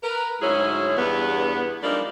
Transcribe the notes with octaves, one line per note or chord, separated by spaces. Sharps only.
A#4 B4
D2 G#2 F#3 C#4 E4 G#4
E2 G2 B3
F3 G3 G#3 A#3 D4 D#4